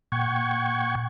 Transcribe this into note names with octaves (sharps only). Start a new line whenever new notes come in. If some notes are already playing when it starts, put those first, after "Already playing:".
A#2 F#5 G5 C#6 G#6